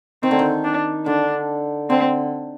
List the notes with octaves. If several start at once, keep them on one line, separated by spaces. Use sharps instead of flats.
D#3 C4
D3
D#3
D4
D3 D4
D3 C4